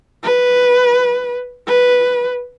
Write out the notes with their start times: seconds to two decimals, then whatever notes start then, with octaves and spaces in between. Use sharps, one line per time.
0.24 B4
1.67 B4